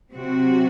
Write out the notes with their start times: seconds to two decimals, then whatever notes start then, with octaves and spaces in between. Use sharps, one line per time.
0.13 C3 F#3 C4 F#4